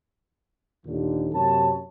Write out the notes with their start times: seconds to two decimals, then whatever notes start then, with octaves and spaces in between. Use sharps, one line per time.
0.86 D#2 A#2 D3
1.33 F#2 C3 A#3 C#5 A5